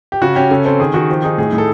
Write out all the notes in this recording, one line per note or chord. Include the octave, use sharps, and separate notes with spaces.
G4
C#3 F#4
C#4 G4
C#3 A4
C4 A4
D#3 G#4
D#3 F#4
F3 G4
D#4 G#4
A2 G#4
A2
A4